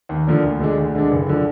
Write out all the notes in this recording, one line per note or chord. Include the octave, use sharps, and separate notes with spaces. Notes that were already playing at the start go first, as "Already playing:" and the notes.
D#2
D3 F3 A#3 D4
D2
D3 G#3 D4
D2
D3 G#3 D4
F#1
D3 F3